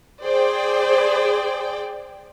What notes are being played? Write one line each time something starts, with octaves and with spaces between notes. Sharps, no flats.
G#4 C5 D5 G5